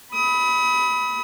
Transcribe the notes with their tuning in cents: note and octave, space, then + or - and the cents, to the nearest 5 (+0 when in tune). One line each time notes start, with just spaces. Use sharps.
B5 +0 D#6 +40